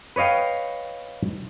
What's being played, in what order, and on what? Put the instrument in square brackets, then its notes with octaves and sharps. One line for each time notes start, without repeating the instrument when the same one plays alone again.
[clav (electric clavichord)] B4 C#5 D#5 F5 G5